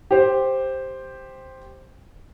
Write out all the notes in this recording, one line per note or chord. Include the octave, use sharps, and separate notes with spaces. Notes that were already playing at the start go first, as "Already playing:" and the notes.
G4 C5